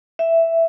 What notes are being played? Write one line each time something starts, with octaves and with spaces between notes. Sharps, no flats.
E5